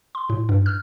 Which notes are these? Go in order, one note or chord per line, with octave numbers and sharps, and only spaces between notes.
C6
A2
G2
F6